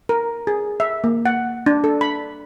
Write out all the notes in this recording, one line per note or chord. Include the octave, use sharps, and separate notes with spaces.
A#4
G#4
E5
A#3
F#5
D4
A4
B5